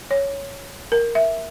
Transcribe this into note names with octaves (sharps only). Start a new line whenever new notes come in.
C#5
A#4
E5